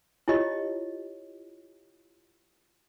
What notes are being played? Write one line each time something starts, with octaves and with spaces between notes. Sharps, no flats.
E4 F4 G4 C#5 D#5